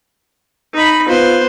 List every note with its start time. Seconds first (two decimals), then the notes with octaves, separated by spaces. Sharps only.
0.74 D#4 B5
1.08 B3 F4 C5